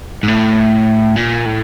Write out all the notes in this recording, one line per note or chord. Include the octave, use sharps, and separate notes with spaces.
G#2
A2
A#2
A2